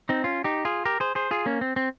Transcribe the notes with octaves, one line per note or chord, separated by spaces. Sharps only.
C4 D#4
C#4 F4
D#4 G4
F4 G#4
G4 A#4
G#4 C5
G#4 C5
F4 G#4
A#3 C#4
C4
C4